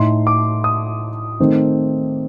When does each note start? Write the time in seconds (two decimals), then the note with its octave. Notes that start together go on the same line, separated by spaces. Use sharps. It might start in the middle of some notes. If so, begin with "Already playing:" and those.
Already playing: A2 A3 D#4 C6
0.27 D6
0.64 D#6
1.40 D#3 A3 C4 D#4